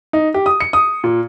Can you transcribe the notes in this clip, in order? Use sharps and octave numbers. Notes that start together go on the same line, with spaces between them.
D#4
G4
D#6
C#7
D#6
A#2